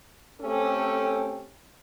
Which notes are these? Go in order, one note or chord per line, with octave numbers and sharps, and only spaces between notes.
A3 C4 C#4 G4 A4